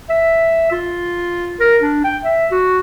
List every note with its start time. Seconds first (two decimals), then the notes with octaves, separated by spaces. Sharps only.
0.09 E5
0.71 F4
1.60 A#4
1.81 D4
2.04 G5
2.24 E5
2.51 F#4